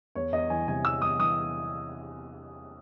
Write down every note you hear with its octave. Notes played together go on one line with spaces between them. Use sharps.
E2 C#5
E2 D#5
E3 G#5
C3 G#5
E2 E6
E2 D#6
E3 D#6